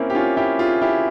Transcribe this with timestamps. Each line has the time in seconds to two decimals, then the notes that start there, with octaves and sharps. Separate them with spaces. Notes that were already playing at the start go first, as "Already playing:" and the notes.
Already playing: A#3 C4 C#4 E4
0.10 G4
0.15 C#4 F4
0.37 E4 G4
0.59 F4 G#4
0.82 E4 G4